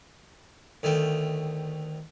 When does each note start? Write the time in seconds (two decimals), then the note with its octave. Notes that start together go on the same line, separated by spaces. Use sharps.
0.83 D2 D#3 A3 G5